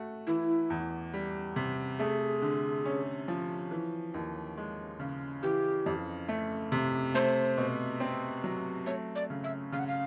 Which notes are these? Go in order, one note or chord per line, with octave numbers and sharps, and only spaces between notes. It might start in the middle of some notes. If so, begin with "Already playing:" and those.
Already playing: A3 F#4
E3 E4
E2
G3
C3
A3 G#4
D3
C#4
F3
E3
D#2
G#3
C#3
E3 G4
F2
A3
C3
A3 C5
B2
C4
F#3
A3 C#5
D5
C#3
E5
C#3 F5
F#5
F5